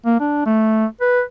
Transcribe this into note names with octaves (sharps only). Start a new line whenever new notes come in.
A#3
D4
A3
B4